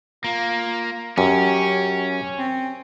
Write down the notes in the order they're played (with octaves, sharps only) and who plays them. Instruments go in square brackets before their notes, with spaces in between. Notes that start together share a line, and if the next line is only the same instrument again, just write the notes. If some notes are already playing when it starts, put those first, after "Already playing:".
[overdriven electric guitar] A#3 [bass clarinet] F4
[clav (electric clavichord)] F#2 [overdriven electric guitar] C#4 [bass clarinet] G4
[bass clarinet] C4